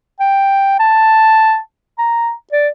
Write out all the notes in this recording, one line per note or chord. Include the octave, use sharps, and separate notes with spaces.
G5
A5
A#5
D5